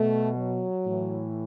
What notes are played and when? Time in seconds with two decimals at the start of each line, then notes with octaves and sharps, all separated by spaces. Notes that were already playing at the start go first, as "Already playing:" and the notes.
Already playing: B2 A3
0.35 F#3
0.86 A2 E3